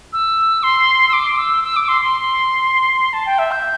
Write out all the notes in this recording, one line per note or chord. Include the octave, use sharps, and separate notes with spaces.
E6
C6
E6
D6
E6
E6
D6
C6
C6
A5
G5
E5
G6